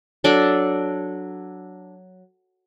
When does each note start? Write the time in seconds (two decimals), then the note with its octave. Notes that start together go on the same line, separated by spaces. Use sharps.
0.24 F#3 D4 A4 D5